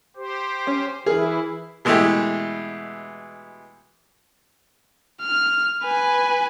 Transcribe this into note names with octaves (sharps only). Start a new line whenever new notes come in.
G4 C5
C#4
E3 E4 G#4 A#4 B4
B2 E3 G#3 A3 E4 G4
F6
B4 G#5